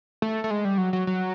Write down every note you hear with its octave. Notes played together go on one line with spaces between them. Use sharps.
A3
A3
G#3
G3
F#3
F#3
F#3